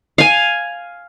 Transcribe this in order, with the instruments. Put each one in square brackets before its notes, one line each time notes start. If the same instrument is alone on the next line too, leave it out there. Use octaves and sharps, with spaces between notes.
[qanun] F5 G#5